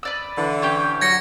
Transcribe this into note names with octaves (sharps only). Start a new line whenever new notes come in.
B4 D5 E6
D3 E3
C#4 G4 G5
F#3 G#6 A#6 C#7